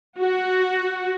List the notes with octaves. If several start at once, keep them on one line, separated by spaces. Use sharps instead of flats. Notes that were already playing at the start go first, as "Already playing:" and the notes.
F#4